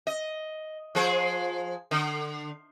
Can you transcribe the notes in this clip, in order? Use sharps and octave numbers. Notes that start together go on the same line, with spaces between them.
D#5
F3 G#4 C5
D3